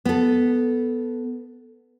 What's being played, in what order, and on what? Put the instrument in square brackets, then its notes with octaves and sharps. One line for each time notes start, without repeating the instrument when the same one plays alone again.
[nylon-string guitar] B3 A4